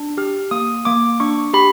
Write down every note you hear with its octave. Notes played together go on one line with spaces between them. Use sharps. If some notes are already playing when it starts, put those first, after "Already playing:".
Already playing: D4
G4 F6
A#3 D#6
A#3 D6
D4 C#6
G4 B5